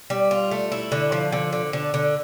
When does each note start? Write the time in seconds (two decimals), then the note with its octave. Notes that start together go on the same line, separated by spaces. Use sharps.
0.10 G3
0.31 F4
0.51 A3
0.72 E4
0.92 D3
1.12 F3
1.32 D3
1.53 D3
1.73 D3
1.94 D3